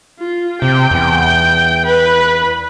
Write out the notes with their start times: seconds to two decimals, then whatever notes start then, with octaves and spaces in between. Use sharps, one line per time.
0.20 F4
0.62 C3 G5
0.91 E2
1.87 B4